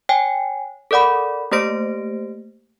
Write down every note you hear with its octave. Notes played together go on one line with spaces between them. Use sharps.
C#5 G5 G#5
A4 A#4 D5 F#5 B5
A3 A#3 G4 C5 A#6 D7